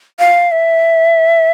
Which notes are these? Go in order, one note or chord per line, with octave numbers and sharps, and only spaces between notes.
F5
E5